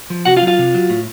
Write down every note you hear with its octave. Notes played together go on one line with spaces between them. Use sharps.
F3
C3 F#4 F#5
F4 F5
F#3
F4 F5
C3
F#3
A2